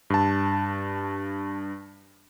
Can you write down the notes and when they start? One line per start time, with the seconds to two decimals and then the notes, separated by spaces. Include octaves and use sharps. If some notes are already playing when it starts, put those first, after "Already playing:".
0.10 G2 A5